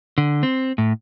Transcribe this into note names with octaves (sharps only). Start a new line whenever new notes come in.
D3
C4
A2